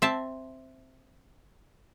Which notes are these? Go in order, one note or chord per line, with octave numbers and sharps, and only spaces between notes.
C4 E5 A5